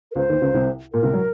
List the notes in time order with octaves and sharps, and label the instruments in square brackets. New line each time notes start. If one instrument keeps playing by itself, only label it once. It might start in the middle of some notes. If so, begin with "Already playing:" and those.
[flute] A#4
[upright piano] C#2 C#3 [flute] C5
[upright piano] D#2 D#3
C#2 C#3
C2 C3
[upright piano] A#2 [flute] A#4
[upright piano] C2 C3
F#3